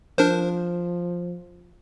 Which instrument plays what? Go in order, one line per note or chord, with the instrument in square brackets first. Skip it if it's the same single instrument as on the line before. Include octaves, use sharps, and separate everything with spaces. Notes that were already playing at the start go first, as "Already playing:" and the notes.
[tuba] F3 [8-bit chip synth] D4 A#4 C5